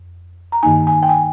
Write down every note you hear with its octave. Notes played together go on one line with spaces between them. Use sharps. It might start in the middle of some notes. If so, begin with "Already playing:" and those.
Already playing: F2
A#5
G2 D#3 A#3 D#4 G#5
G#5
G5
G#5